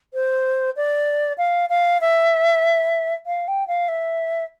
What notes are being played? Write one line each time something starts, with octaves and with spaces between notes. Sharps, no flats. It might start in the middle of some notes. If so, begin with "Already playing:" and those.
C5
D5
F5
F5
E5
F5
G5
F5
E5